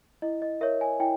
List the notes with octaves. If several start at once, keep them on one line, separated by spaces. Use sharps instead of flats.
E4 D#5
D#5
A#4 C#5 E5
G#5
E4 G5